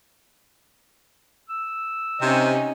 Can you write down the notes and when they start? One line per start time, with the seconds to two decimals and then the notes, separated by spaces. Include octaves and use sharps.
1.49 E6
2.20 C3 C#4 D#4